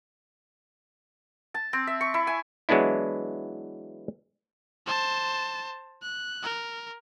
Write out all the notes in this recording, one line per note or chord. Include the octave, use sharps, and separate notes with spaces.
A5
C4
E5
C#6
E4
G#5
E3 F#3 G#3 B3 D4 E4
C5 A5
F#6
A#4